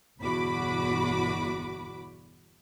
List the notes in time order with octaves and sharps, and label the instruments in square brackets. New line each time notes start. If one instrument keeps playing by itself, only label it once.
[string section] G1 E2 B2 F#4 B5 D6